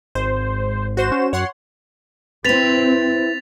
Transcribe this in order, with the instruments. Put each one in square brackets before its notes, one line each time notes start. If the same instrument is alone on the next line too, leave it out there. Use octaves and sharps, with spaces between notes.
[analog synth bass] G#1 [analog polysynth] C5
[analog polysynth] F#4 C5 E7
[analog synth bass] C#4
[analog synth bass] F#2 [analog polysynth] C#5 F#5 C6
[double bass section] C4 [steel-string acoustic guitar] E4 B4 [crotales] A6 B6 F7